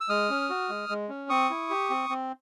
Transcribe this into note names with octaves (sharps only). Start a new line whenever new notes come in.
E6
G#3 D#6 F6
C#4
F#4
G#3
G#3
C#4
C4 C#6 D#6
E4
G4
C4
C4